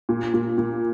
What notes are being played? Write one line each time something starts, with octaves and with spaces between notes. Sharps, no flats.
A#2
A#2
A#2